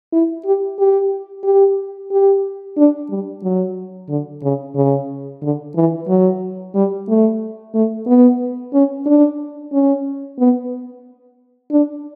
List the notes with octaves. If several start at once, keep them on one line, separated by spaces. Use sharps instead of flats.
E4
G4
G4
G4
G4
D4
G3
F#3
D3
C#3
C#3
D3
E3
F#3
G3
A3
A3
B3
C#4
D4
C#4
B3
D4